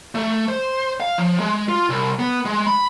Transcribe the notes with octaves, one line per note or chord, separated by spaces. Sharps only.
A3
C5
F5
F3
G#3
F4
C2
B3
G#3
B5